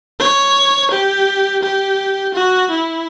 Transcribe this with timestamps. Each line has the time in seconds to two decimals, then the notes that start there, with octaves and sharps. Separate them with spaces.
0.20 C#5
0.91 G4
1.62 G4
2.34 F#4
2.70 E4